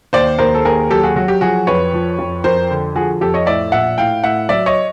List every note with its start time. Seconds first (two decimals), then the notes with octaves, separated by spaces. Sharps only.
0.13 D#2 C5 D5
0.38 D#2 A#4 C5
0.55 A4
0.65 D#2 G#4 A#4
0.90 F#3 G4 A4
1.03 F#4 G#4
1.16 F#3 F#4
1.28 G4
1.41 F3 F#4 G#4
1.67 F2 B4 C#5
1.93 F3
2.19 F2
2.44 F2 A#4 C5
2.70 D3
2.95 F3 F#4 G#4
3.21 F2 G4 A4
3.34 C#5 D#5
3.46 A2 D5 E5
3.72 A#1 E5 F#5
3.98 A2 F5 G5
4.24 A2 E5 F#5
4.49 F#3 D5 E5
4.66 C#5 D#5